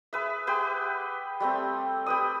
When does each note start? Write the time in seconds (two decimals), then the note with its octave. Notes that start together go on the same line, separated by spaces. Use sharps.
0.13 G#4 B4 E5
0.47 G4 G#4 B4 F#5
1.40 G3 A3 C4
2.06 G4 B4 D#6